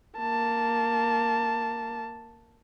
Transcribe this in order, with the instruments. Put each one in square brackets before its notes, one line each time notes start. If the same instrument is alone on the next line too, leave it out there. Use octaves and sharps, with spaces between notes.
[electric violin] A#3 A5